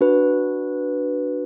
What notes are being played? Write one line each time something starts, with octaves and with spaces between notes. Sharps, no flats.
D4 F#4 B4